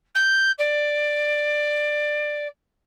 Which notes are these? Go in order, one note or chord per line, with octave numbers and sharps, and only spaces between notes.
G6
D5